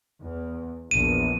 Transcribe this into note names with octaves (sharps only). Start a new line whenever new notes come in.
E2
A#1 E2 D#7